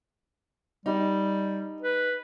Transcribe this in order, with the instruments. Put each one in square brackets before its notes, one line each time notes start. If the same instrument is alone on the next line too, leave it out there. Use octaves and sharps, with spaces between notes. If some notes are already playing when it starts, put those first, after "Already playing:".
[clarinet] G3 [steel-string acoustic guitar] D#4 G4
[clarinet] B4